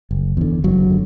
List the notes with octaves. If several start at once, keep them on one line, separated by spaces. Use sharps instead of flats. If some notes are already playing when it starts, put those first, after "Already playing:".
F#1
E2 D3
F#1 F#3
D3